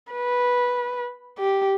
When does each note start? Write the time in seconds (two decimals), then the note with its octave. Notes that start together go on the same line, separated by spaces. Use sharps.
0.12 B4
1.38 G4